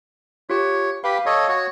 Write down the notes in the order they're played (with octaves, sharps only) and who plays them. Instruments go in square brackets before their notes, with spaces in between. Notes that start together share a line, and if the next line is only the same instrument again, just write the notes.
[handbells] F4 G4 [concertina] C#5
[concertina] G4 B4 [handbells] F5
[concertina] A4 C#5 D#5
F#4 C#5